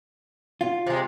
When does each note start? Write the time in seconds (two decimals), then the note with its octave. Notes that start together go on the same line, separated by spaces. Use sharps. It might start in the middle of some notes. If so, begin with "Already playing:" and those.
0.61 F4
0.86 C3 G#3